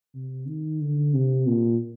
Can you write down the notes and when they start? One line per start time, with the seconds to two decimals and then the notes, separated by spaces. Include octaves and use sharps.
0.14 C3
0.47 D#3
0.81 D3
1.14 C3
1.47 A#2